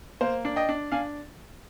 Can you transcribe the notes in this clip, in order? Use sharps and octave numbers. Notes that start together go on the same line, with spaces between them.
A#3 C5
D4
D#5 G5
D4
D4 F5 G#5